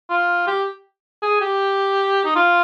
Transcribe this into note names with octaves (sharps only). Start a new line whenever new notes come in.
F4
G4
G#4
G4
D#4
F4